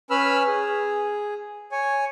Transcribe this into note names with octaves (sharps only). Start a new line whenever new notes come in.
C#4 B4 B5 E6 F6
G#4
C#5 G#5